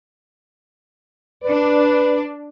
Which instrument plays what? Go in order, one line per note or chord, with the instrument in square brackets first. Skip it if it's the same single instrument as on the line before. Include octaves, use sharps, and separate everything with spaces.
[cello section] D4 D5 [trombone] B4